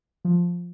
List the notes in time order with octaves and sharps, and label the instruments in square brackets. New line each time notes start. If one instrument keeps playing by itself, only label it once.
[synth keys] F3